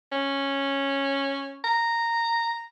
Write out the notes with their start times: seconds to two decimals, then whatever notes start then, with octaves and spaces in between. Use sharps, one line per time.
0.12 C#4
1.64 A#5